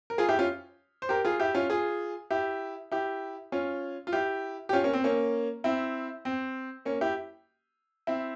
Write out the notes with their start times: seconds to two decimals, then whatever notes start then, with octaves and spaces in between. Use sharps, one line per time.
0.10 A#4
0.18 F4 G#4
0.29 E4 G4
0.39 C#4 F4
1.02 C5
1.09 G4 A#4
1.25 F4 G#4
1.40 E4 G4
1.54 C#4 F4
1.70 F4 G#4
2.31 E4 G4
2.92 E4 G4
3.52 C#4 F4
4.07 F4
4.13 E4 G4
4.69 G4
4.73 C#4 F4
4.84 A#3 C#4
4.93 C4
5.04 A#3 C#4
5.64 C4 E4
6.25 C4
6.85 A#3 C#4
7.01 E4 G4
8.07 C4 E4